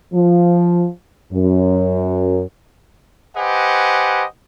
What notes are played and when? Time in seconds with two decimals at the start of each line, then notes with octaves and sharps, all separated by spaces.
0.13 F3
1.33 F#2
3.36 G4 B4 C5 D#5 F#5 G#5